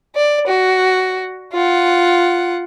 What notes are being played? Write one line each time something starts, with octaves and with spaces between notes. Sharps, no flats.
D5
F#4
F4 F#5